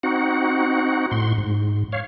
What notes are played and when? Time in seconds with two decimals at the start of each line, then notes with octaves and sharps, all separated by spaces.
0.03 C4 D#4 F#4 F#5
1.11 A2 C6
1.38 G#2
1.92 C#5 F5